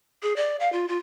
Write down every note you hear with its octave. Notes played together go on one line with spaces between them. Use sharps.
G#4
D5
F5
F4
F4